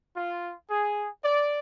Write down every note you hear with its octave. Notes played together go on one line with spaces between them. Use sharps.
F4
G#4
D5